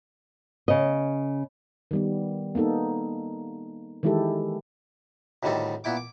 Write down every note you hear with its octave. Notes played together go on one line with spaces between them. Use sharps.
C#3 D#5
D#3 G3 B3
A#3 B3 D#4 A4
D#3 E3 G#3 E4 G4 A4
D2 A2 D#3 G3 C4 A4
A#2 B3 E4 G5 D6
D6